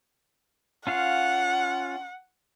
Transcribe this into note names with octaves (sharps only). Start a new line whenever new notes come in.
C#4 F4 F5 F#5